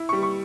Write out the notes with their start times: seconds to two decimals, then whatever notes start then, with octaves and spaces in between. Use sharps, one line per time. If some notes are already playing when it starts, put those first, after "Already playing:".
Already playing: E4
0.09 C#6
0.13 G3
0.23 C#6